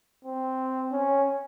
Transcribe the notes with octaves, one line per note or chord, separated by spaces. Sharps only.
C4
C#4